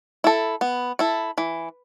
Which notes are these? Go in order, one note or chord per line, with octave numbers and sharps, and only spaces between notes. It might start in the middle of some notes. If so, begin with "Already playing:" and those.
E4 A4
B3
E4 A4
E3